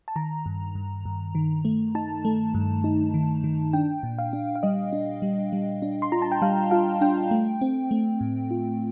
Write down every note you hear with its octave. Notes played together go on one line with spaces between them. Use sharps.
A5
D#3 A#5
G2
G2
G2
D#3
A3
D#4 A5
A3
G2
D#4
D#3
D#3
D4 G5
A#2
F5
D4
F5
G3 D#5
D4
G3
G3
D4
C6
F4 A#5
A5
G5
G3 F5
F4 F5
D4 G5
A3
C4
A3
A2
F4